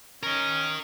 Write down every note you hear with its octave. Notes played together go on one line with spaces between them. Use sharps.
C#4 A#4 D#5